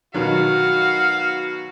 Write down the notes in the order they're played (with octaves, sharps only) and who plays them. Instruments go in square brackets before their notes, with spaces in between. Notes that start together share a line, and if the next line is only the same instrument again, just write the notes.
[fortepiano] B2 D#3 F#3 [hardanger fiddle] F#4 [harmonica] F5